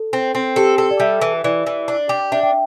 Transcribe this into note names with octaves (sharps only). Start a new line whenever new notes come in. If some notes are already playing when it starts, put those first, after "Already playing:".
Already playing: A4
C4
C4
G4 A4
A4
D5
G3 E5
E3
E3 D5
E3
D4
G4
D4 E5
G5